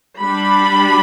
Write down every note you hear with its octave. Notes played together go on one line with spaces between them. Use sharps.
G3 D4 B5